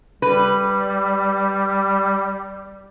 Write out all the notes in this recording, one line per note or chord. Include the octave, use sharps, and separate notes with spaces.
G3 B4